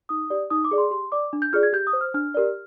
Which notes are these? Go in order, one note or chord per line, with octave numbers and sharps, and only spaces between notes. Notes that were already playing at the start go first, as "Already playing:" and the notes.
D#4 D#6
G4 D5
D#4 D#6
D6
G#4 D5
C6
G4 C6
D5 D6
D4
G6
F4 G#4 D5 F6
G#6
G4 G6
D#6
C5
F6
D4 F6
G4 A#4 D5